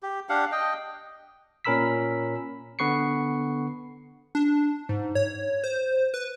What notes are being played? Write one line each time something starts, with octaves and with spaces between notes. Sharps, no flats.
G4
D4 G4 F5 F#5
D#5 G5
A#2 C#4 A#4 B5 E6 B6
D3 B3 B4 C#6 C7 C#7
D4
G#2
C#5
C5
B4